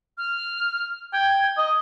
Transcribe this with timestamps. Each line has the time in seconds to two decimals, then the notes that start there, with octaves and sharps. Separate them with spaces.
0.18 F6
1.13 G5 G#6
1.58 D#5